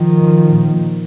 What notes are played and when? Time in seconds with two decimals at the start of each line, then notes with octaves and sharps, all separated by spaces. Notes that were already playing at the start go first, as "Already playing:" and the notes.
Already playing: D#3 F3
0.49 A#2